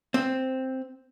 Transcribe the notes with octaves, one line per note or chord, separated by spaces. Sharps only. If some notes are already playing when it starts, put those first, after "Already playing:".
C4